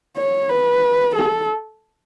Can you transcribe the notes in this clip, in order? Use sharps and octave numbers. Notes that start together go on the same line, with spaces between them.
C#5
B4
A4